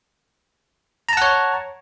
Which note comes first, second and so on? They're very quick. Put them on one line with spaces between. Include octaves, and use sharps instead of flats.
A#5 A5 F#5 C#5